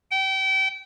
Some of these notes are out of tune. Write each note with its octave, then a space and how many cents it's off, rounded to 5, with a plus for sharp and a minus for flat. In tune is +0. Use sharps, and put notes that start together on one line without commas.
G5 -30